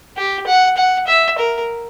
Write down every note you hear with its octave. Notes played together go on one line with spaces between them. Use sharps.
G4
F#5
F#5
E5
A#4